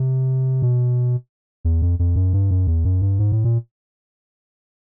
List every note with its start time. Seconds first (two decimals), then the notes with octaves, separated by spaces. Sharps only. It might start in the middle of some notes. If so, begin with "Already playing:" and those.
Already playing: C3
0.62 B2
1.65 E2
1.82 F2
1.99 F2
2.16 F#2
2.33 G2
2.51 F#2
2.67 E2
2.85 F#2
3.02 G2
3.19 G#2
3.32 A2
3.44 A#2